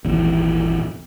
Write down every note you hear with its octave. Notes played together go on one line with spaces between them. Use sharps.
G#1 D#2 A#2 E3